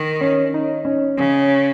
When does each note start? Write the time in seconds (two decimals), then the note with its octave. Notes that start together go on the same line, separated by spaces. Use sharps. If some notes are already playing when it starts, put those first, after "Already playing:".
Already playing: D#3
0.21 C#4
0.54 D#4
0.85 C#4
1.17 C#3